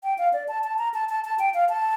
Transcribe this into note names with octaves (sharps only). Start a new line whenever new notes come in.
G5
F5
D5
A5
A5
A#5
A5
A5
A5
G5
F5
A5